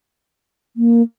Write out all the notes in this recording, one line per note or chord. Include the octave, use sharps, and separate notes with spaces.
A#3